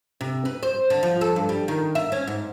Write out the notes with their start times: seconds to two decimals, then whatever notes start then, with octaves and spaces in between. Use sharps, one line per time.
0.21 C3
0.45 B4
0.63 C5
0.90 D3
1.03 F3
1.21 A4
1.36 G2
1.49 G3
1.68 D#3
1.95 E5
2.12 C#4
2.27 G#2